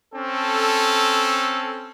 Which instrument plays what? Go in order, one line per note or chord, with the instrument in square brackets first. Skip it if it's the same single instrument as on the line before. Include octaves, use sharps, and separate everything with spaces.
[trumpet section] C4 C#4 A4